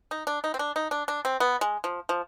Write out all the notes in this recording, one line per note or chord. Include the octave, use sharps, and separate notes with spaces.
D#4
D4
D#4
C4
D4
D#4
D4
D4
C4
B3
G#3
F3
F3